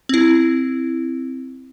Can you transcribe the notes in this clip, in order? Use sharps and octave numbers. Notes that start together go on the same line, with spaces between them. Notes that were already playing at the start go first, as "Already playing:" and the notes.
C4 E4